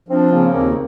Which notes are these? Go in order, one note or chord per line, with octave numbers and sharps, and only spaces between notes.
F3 C4 D4
C#3 A#3 C4
D#2 A#3 C4